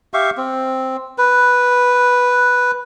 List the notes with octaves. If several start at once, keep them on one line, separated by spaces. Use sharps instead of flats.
G4 E5 F5 C#6
C4
B4